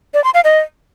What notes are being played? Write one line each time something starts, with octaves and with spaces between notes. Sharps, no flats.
D5
C6
F5
D#5